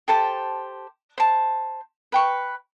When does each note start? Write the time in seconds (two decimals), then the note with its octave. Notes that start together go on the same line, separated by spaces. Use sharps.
0.08 G4 A4 C5 A5
1.18 C5 A5
2.12 B4 G5 C#6